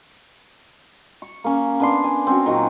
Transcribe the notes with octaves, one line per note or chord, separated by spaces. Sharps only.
C#6
A#3 C#4
B3 D4 C6
G#5
C4 C#4 F#4
A#2 D#3 F#3